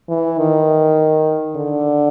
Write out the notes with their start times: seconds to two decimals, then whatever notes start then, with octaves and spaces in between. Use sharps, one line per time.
0.09 E3
0.38 D#3
1.56 D3